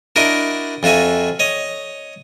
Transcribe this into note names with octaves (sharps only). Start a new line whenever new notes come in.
D4 E4 F#4 A#4 D#5
F2 F4 F#4 E5 G#5
C#5 D#5